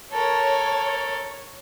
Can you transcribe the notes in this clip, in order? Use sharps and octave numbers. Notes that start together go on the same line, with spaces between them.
A4 A#4 C#5